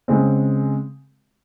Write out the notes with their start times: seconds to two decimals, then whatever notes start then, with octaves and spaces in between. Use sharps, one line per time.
0.08 C#3 G#3 C4